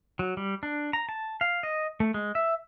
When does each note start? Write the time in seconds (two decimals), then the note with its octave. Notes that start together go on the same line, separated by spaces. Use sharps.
0.19 F#3
0.37 G3
0.63 D4
0.93 A#5
1.09 A5
1.41 F5
1.63 D#5
2.00 A3
2.14 G#3
2.35 E5